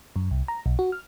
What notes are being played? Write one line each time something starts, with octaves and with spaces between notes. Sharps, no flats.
F#2
C2
A#5
B1
F#4
F6